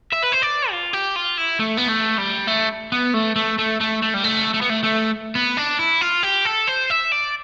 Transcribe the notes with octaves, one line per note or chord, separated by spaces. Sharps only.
E5
B4
C5
D5
F4
G4
F4
E4
A3
B3
A3
G3
A3
B3
A3
A3
A3
A3
A3
G3
A3
A3
B3
A3
A3
B3
D4
E4
F4
G4
A4
C5
E5
D5